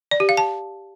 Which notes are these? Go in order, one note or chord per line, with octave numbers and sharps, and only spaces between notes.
D5
G4
F5
A5